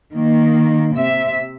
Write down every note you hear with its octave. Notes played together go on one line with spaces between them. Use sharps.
D#3 A#3
C3 E5